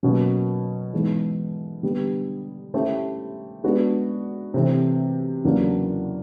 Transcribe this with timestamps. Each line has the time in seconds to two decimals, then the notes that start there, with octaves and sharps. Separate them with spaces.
0.03 B2 F#3 A#3 C#4
0.93 G#2 E3 G#3 B3
1.83 D3 G3 B3 D4 G4
2.74 A3 C#4 E4 G4 C5
3.64 G#3 B3 D4 F#4
4.54 C3 E3 A3 C4
5.44 E2 C#3 F#3 A#3 D4